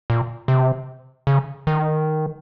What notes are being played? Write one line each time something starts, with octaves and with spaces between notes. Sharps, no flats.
A#2
C3
C#3
D#3